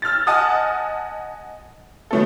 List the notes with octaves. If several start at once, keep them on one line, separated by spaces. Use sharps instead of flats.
E6 F6 G6 A6
D#5 F#5 G#5 A5 D#6 F6
D#3 F#3 A3 B3 C#4 A4